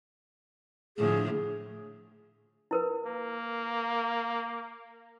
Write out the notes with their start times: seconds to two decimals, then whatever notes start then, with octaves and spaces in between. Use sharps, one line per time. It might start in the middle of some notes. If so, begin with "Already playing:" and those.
0.97 A2 D3 F3 G#4
2.71 E4 A#4 B4
3.07 A#3